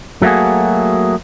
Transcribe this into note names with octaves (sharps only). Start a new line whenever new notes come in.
F#3 A3 A#3 F#4 G#4